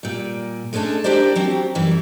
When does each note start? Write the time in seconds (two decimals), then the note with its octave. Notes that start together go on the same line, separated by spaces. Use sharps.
0.03 A#2 G3
0.73 G#3 A3 C#4 D4 A4
1.04 D4 E4 G4 A#4 C5 D5
1.36 F#3 C4 G4
1.75 F#2 E3 G3